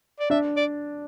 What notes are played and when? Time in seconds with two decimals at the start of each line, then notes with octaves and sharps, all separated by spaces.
0.20 D5
0.30 D4 E5
0.57 D5